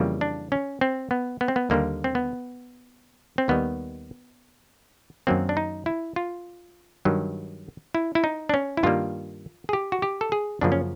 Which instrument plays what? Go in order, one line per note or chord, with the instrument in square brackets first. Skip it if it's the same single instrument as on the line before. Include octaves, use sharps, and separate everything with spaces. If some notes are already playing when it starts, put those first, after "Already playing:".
Already playing: [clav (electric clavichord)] F2 C#3 E3 G3 A#3
D4
C#4
C4
B3
B3
C4
B3
D#2 D3 G3 A#3
C4
B3
C4
D#2 D#3 G3 B3
F#2 D#3 F#3 A#3 C4
D4
D#4
E4
F4
G2 D#3 F#3
E4
E4
D#4
D4
C#4
E4
G2 D#3 G3 A#3 F4
G#4
G4
F#4
G4
A4
G#4
F#2 C#3 F3 A#3 D4
C#4